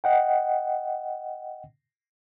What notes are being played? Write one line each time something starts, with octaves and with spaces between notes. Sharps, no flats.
D#5 F#5 G5